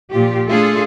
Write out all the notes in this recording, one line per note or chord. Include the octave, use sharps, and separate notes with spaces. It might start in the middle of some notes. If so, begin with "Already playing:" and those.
A#2 F3 F4 G4
A3 D4 F4 G#4 A4